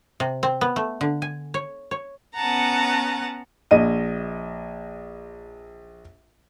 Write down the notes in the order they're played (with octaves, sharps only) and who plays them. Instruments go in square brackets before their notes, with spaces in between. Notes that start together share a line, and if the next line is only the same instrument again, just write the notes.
[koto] C3
C4
B3
A3
D3
G#5
C#5
C#5
[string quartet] B3 C#4 F#5 A5 A#5
[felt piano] A#1 D#5 D#7